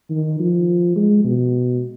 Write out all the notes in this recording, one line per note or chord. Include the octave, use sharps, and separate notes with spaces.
D#3
F3
G#3
B2